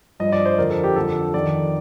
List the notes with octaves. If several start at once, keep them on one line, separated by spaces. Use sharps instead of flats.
G2 F3 D#5
D5
C5
F2 D3 F3 A#4
A4
G4
F2 D3 F3 A4
F2 D#3 D5